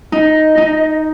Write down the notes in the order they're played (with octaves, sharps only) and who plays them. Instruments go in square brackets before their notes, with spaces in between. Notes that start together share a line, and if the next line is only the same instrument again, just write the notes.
[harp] D#4 [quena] D#5
[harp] D#4